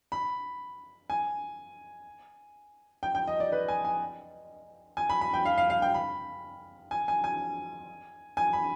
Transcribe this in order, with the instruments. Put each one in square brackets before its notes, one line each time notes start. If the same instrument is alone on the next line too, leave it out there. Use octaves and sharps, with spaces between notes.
[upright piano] B5
G#5
G5
G5
D#5
D5
B4
G#5
G#5
G#5
B5
B5
G5
F5
F5
F5
G5
B5
G#5
G#5
G#5
G#5
B5